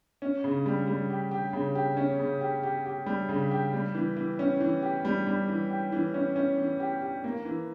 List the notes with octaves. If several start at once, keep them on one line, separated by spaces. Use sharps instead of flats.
C#4
C#3
G3
G3
G4
G4
C#3
G4
C#4
C#3
G4
G4
G4
G3
C#3
G4
G3
E3
E3
C#4
E3
G4
G3
G3
E3
G4
E3
C#4
C#4
E3
G4
G4
A#3
E3